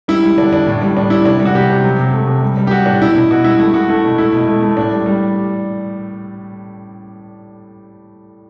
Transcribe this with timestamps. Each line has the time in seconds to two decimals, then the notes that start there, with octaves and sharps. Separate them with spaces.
0.08 G3 E4
0.23 G3
0.37 D3 D4
0.52 D3 D4
0.67 A2
0.82 G3
0.96 A2 D4
1.10 G3 E4
1.25 C3 D4
1.40 G3
1.45 F#4
1.55 C3 G4
1.70 C3
1.84 F#3
1.99 C3
2.13 A3
2.28 C3
2.43 G3
2.57 G3
2.67 G4
2.71 G3 F#4
2.86 A2 D4
3.00 B2 E4
3.16 B2
3.30 B2 F#4
3.44 G3 E4
3.59 A3 E4
3.74 A3 F#4
3.89 A3 E4
4.04 B2
4.18 A3 E4
4.33 B2
4.48 A3
4.62 A3
4.77 A2 D4
4.91 G3
5.06 G3